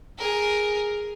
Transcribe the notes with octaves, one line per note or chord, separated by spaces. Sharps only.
G#4 A#4